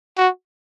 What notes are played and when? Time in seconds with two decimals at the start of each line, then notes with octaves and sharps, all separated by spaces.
0.17 F#4